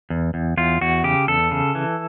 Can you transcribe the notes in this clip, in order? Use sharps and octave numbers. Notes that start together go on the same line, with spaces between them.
E2
E2
E2 F4
E2 F#4
C#3 G4
E2 A4
C#3
E3